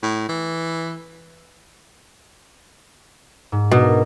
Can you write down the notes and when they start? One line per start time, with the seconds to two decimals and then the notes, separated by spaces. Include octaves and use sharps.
0.03 A2
0.29 E3
3.52 G#2
3.72 B2 D4 A#4